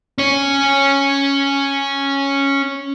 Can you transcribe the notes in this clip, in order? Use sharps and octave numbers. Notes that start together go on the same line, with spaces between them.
C#4 C#5